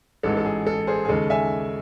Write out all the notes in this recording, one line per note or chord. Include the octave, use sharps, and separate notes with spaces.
A1 G#2 E3 G#3 A4
A4
G#4
A4
G#4 C5
G#4
D#2 C#3 G#3 A4
E5 G#5